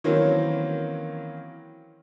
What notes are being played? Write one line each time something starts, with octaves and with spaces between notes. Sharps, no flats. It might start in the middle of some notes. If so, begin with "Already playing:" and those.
D#3 E3 F#3 A#3 C4 C#4